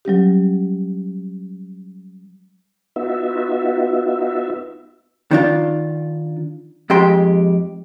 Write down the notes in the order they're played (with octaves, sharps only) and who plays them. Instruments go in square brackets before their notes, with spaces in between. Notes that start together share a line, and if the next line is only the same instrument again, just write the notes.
[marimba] F#3 G3 C#4 G4
[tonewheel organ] B3 D#4 F4 F#4 E5
[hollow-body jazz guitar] D#3 D4 F4
F2 G#3 G4 C6